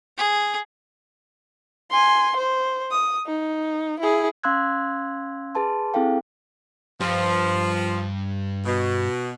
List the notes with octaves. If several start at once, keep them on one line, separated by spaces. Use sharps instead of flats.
G#4
G#5 C6
C5
D#6
D#4
E4 G#4
C#4 F5 C6 E6 F#6 G#6
G#4 B4 A5 C6
C4 E4 G#4 A4 F5 G5
G2 F3
B2